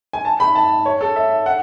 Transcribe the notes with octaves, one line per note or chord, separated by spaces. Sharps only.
G#5
A5
B5
A5
C#5
A4
E5
F#5